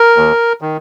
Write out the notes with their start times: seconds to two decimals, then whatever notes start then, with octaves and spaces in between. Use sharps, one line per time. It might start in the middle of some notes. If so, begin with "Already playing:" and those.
Already playing: A#4
0.17 D#2
0.61 D#3